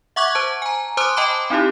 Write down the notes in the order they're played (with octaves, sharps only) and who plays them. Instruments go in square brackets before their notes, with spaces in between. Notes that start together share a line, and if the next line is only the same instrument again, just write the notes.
[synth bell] E5 F#5 C#6 D6 F#6 G#6
C5 A5
G#5 A#5
C5 A5 C6 D6 D#6 F#6
D#5 G5 A5 B5 D6
C4 D#4 E4 G4